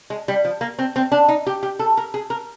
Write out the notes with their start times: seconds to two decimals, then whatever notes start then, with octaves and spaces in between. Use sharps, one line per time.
0.10 G#3
0.28 G3
0.45 F3
0.61 A#3
0.79 C4
0.96 C4
1.12 D4
1.29 D#4
1.47 G4
1.63 G4
1.79 A4
1.97 A#4
2.14 G#4
2.30 A#4